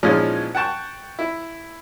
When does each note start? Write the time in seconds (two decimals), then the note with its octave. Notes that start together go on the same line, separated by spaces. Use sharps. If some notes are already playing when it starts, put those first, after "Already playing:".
0.03 A#2 E3 F3 G#3 C#4 D#4
0.55 F#5 G5 A5 C#6 F#6
1.19 E4